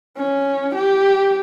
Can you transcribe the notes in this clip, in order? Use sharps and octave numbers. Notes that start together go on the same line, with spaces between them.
C#4
G4